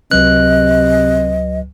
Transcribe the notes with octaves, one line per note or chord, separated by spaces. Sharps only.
C#2 C3 F#3 B4 D#5 F#6